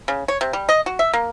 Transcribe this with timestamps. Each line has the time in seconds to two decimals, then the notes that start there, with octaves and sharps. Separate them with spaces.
0.08 C#3
0.28 C#5
0.41 C3
0.53 G3
0.69 D#5
0.86 F#4
0.99 E5
1.13 A#3